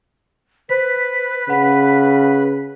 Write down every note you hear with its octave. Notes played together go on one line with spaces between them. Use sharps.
B4 C5 B6
C#3 F#5 B5